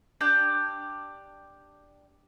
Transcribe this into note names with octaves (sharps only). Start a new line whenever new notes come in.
D4 G4 D5 G6